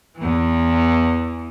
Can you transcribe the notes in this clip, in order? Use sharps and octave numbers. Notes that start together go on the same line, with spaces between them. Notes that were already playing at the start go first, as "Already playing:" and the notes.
E2 E3